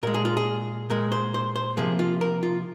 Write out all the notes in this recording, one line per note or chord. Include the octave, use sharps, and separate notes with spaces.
A#2 G#3 A#4
G#4
F4
G#4
A#2 G#3 A#4
C5
C5
C5
C3 F3 A#3 G#4
F4
A#4
F4